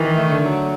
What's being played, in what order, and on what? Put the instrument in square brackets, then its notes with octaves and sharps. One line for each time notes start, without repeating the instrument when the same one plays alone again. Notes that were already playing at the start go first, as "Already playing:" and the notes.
Already playing: [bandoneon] D#3 [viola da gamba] E3
[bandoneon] A3
[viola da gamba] D3
[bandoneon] F#3